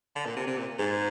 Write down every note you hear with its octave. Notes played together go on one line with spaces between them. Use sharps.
D3
A#2
C3
C3
A#2
G#2